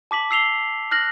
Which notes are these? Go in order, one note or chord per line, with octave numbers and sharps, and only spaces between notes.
A5 D6 B6 F#7
E6 C7 F7 G7
F6 F#6 A#6 F#7